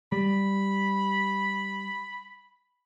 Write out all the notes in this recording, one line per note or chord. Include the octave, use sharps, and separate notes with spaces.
G3 B5